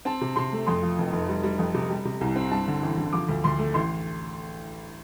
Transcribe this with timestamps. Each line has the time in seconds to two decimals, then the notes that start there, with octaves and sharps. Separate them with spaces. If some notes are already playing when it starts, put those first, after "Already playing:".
0.05 C4 A5
0.21 C3
0.36 C3 C6
0.52 A3
0.67 F2 C6
0.83 F3
0.98 F1
1.13 F1
1.28 G3
1.43 G3
1.59 F2
1.74 C3
1.90 G3
2.05 C3
2.21 C2
2.36 C4
2.51 G2 A5
2.68 D3
2.83 A1
2.98 D3
3.13 F3 D6
3.29 D2
3.44 D2 C6
3.59 A3
3.74 A1 C6